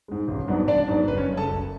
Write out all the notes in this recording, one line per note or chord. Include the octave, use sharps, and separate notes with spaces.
G#2 G#3
A1
G#2 F#3 B3 D4
A1 D4 D5
G#2 F#3 B3 D4
F#1 B4
C#4 C#5
F#2 C#3
A4 A5
F#1